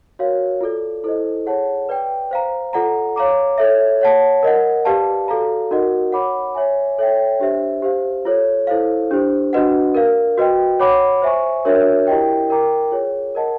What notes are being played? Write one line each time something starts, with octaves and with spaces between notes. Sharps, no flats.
F#4 A#4 C#5 F5
F4 A4 D5
E4 A4 C5 D#5
G#4 C#5 F#5 A5
B4 D5 G5
C5 F5 A#5
F4 A4 D5 F#5 A#5
C#5 F5 A#5 D6
A4 C#5 E5
C#5 F#5 A5
A#4 D#5 F#5
G4 B4 D5 F5 A5
F#4 A4 D5 F5 A#5
D#4 F#4 A#4 D#5 F#5
C#5 F#5 B5 D6
C#5 E5 G#5
A4 C#5 E5 G5
D4 G4 C5 E5
G4 C5 F5
F4 A4 C#5
E4 A4 C5 F5
D4 G4 C5
D4 F#4 B4 D#5 F#5
A#4 D5 F5
F#4 B4 D#5 G5
C#5 F#5 B5 D6
C5 E5 G#5 C#6
D4 F#4 A#4 C#5 E5
E4 G4 A#4 D#5 G5
A#4 D5 G5 A#5 D6
F4 G#4 C#5
A#4 D#5 F#5 A5